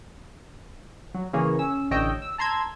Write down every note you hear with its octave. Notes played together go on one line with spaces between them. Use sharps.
F#3
C#3 E3 A#3 G#4 C#5
C#4 E6
A1 D3 C#5 D#5 G5 E6
E6
A5 A#5 C6 E6 G#6